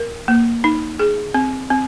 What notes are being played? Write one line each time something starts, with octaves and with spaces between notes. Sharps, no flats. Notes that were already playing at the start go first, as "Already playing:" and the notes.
Already playing: A#4
A#3
D#4
G#4
C4
C4